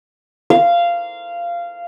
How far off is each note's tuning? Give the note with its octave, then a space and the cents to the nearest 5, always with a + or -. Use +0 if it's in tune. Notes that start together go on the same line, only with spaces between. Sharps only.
F5 -15